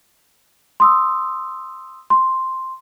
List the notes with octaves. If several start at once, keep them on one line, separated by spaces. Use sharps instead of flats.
C6 D#6 E6
C6